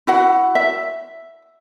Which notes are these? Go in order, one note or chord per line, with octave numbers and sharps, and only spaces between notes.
E4 F#4 F#5
E5